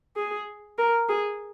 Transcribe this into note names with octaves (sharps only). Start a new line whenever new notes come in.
G#4
A#4
G#4